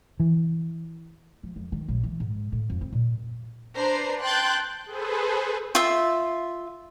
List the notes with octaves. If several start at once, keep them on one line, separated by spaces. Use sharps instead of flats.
E3
F3
F2
D#3
A#1
E3
G#2
A2
F2
C4
A#2
D4 B4 C5 A#5 C7
G5 A5 C6 F#6 G6 A6
G#4 A4 B4 C5
F4 E5